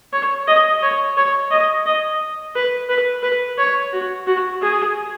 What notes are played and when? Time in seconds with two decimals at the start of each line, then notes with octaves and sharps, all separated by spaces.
0.13 C#5
0.47 D#5
0.82 C#5
1.17 C#5
1.51 D#5
1.86 D#5
2.55 B4
2.89 B4
3.23 B4
3.58 C#5
3.92 F#4
4.27 F#4
4.62 G#4